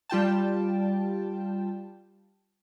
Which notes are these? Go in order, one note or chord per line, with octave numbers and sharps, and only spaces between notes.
G3 F4 G5 A5